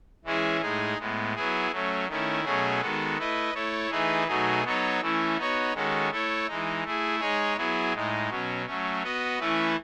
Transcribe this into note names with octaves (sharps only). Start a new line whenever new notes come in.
E3 G#3 C#4 E4 G#4
A2 G#3 D#4 G#4
A2 G#3 B3
F#3 B3 E4 G#4
F#3 A3 C#4
D#3 A3 C#4 E4
B2 F#3 A3 C#4 G#4
D#3 G#3 B3 F#4 A4
A3 E4 B4 D#5
A3 E4 A4 C#5
E3 A3 D#4 G#4 B4
B2 F#3 A3 D#4 G#4
F#3 B3 D#4 A4 C#5
E3 A3 C#4 E4
B3 D#4 F#4 C#5
D#3 G#3 C#4 F#4 A4
A3 E4 A4 C#5
E3 G#3 D#4
A3 E4 G#4
G#3 D#4 G#4 C#5
F#3 B3 E4 G#4
A2 G#3 D#4
B2 F#3 C#4
F#3 A3 C#4
B3 F#4 B4 D#5
E3 A3 C#4 E4 B4